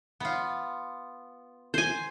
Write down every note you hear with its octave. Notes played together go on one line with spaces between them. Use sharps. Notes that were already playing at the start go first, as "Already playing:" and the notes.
B3 F4
C5 G#5